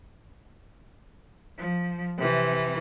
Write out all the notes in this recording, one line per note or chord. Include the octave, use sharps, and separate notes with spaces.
F3
C3 E3